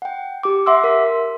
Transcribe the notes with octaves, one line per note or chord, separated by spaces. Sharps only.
F#5 G5
G4 D6
E5 F#5 C6 D6 E6
A#4 B6